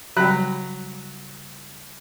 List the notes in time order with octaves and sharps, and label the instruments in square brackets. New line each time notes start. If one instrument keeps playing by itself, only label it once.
[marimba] C#3 G3 [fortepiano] F#3 B5 F#6